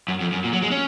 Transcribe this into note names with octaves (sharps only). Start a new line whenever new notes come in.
F#2
F2
F#2
A#2
F#3
G#3
C#4